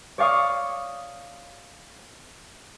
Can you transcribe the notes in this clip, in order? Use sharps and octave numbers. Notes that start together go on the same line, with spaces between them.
C#5 D5 F5 C#6 D#6